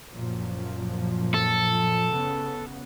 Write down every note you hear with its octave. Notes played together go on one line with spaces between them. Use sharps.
F#2 A#2 F3
A4
C#3 B3